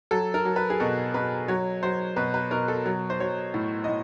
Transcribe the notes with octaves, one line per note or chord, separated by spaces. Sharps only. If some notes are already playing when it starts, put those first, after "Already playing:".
F#3 A4
A#4
F#3
B4
G#4
B2 A4
B2 B4
F#3 C#5
F#3 C5
B2 B4
B4
B2 A#4
A4
F#3
C5
F#3 C#5
A2
D#5
A2